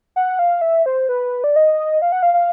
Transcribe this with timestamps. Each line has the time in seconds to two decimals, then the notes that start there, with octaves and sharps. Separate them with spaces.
0.16 F#5
0.39 F5
0.61 E5
0.86 C5
1.09 B4
1.44 D5
1.56 D#5
2.02 F5
2.12 F#5
2.23 F5
2.34 F5